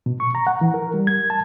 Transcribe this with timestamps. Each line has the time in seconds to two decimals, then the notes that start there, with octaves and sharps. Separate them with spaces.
0.06 B2
0.20 C#6
0.35 A#5
0.47 F#5
0.61 E3
0.74 A#4
0.94 G3
1.07 G#6
1.30 A5